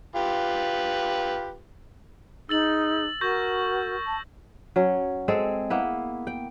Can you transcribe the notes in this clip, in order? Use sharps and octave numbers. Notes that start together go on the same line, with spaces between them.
F4 G4 B4
D#4 G#4 E6 A6 F#7
F#4 A#4 C#6 G6 A#6
A5
F#3 C#4
G#3 C4 G#4 A4
A#3 B3 E4
G5